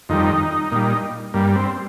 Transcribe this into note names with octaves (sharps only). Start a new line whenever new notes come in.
F2 D#3 G3 D#4
A#2 G3
G2 G3 A#3
C4